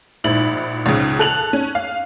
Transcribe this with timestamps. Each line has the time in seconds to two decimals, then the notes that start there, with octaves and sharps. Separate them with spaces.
0.24 A#1 G#2 E4 B5 F#7
0.86 C#2 G#2 C#3
1.19 A4 F#6 F7 F#7
1.53 C#4
1.75 F5